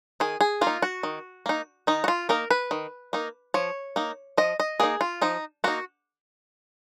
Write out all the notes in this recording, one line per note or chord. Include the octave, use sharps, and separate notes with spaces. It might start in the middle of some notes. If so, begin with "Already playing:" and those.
D#3 G#4
G#4
A#3 F4
D#4
F#4
D#3
A#3 D#4
D#3 D#4
F#4
F4
A#3 D#4 A#4
B4
D#3
A#3 D#4
F3 C#5
A#3 D#4
F3 D#5
D#5
A#3 D#4 G#4
F4
F3 D#4
A#3 D#4 F#4